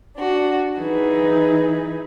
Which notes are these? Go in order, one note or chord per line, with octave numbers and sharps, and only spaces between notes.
D4 F#4
E3 D#4 G#4 B4